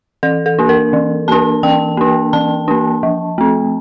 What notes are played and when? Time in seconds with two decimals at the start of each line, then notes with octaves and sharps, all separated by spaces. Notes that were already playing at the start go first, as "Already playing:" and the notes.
0.23 E3 A4
0.46 A4
0.59 A#3 D4
0.69 A#4
0.93 E3
1.28 A#3 D4 A5
1.63 E3 G5
1.97 A#3 D4
2.33 E3 A5
2.68 A#3 D4
3.03 F3
3.38 A3 C4